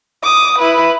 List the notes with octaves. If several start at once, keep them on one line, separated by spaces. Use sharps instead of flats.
D6 D#6
E4 B4